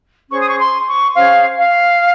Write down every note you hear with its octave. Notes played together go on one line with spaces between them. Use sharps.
C#4 G#4 C5 C#6
D#6
C#6
C6
C#6
C#4 G#4 C5 F5
F5